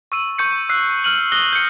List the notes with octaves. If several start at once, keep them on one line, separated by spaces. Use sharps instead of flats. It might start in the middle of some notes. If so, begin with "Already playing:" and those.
C#6 E6 D#7
C#6 G6 C#7
E6 F#6 C7
F6 D#7 F#7
D#6 F#6 A#6 G7
G6 C#7